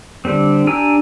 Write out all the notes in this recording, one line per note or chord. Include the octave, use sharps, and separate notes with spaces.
D3 G3 C4
D4 G4 G#5 A#5 E6